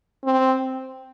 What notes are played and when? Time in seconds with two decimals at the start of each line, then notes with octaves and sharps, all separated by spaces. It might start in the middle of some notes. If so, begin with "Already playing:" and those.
0.24 C4